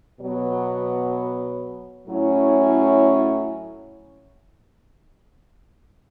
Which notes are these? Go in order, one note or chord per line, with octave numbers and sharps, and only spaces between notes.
B2 F#3 B3
A2 F#3 C#4 E4